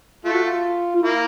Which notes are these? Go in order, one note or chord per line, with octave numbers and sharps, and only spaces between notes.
A3 F4
F#4
F4
F4
A#3 E4